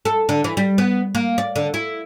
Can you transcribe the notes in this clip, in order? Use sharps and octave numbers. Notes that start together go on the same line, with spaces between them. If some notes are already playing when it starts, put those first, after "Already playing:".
A4
D3
E3
G3
B3
A#3
D5
D3
E4